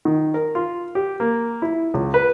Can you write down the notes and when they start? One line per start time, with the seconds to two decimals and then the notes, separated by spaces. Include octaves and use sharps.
0.05 D#3
0.34 A#4
0.55 F4
0.95 G4
1.20 A#3
1.62 E4
1.94 C#2
2.14 B4